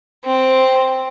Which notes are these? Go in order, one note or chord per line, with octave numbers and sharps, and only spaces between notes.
C4